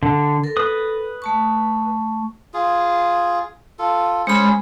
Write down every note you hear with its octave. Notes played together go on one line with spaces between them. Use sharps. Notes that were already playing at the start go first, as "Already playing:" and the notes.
D3
A4 A#4
B4 D#6
A3 A5 C#6
F4 G#4
F4 A4
G#3 C#4 G#4 C5 B5